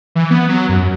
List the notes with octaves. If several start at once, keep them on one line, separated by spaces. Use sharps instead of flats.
E3
B3
F#3
F#2